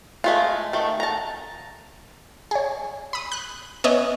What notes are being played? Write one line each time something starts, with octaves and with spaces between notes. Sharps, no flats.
G#3 A3 F4
D#3 A3
A5 A#5
G#4 C#5
B5 D#6
F#6
B3 C#4 C#5 D#5 E5 G#5